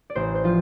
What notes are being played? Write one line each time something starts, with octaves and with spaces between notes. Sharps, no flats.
D5
A1 C5
C5
F3 F4